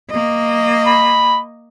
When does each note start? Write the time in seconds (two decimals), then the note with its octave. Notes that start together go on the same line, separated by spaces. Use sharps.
0.10 A#3 D#5
0.86 B5